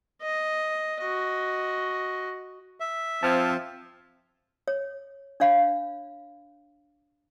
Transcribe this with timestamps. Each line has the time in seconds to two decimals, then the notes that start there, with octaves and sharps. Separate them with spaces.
0.22 D#5
1.01 F#4 D#5
2.80 E5
3.23 F3 C4 A5 F6 G#6
4.68 C#5
5.40 D4 C#5 F5 B5